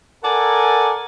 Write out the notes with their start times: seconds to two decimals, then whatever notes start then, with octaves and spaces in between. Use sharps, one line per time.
0.23 A4 A#4 D5 F#5 G#5